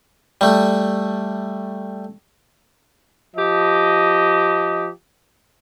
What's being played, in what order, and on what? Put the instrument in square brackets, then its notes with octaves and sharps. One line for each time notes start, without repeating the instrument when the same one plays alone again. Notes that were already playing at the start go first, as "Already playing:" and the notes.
[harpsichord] G3 A3
[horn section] F3 G4 D#5